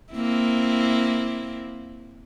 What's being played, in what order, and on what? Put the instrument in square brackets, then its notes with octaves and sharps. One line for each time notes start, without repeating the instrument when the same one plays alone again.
[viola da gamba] A#3 C4 E4